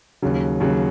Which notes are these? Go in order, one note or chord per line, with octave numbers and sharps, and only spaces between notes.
D#2 C#3 F#3
D#2 C#3 F#3